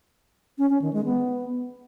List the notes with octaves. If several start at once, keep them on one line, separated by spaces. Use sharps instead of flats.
C#4
C#4
D#3
G#3
B3